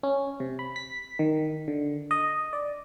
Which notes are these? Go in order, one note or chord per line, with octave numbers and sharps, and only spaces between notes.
C#4
C3
B5
B6
D#3
D3
D#5
D5